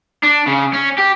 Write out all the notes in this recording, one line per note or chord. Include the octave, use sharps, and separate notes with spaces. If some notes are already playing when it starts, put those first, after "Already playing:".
D4
C#3
C#4
G4